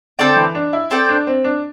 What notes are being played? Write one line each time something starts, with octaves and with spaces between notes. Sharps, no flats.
D3 C4 A4 D5 G5
E3
D4
E4
C4 A4 D5 G5
D4
C4
D4